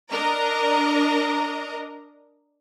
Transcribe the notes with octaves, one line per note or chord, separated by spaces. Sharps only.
D4 A#4 D#5 A#5